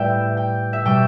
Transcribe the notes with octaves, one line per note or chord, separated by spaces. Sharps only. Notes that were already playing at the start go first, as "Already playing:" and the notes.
Already playing: A2 G3 B4 D5 E5 G5
G5
E5
B2 G3 G5